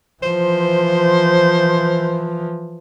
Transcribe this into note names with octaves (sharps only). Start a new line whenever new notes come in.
E3 F3 C5